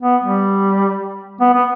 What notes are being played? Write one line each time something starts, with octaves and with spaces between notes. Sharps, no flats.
B3
G3
B3
B3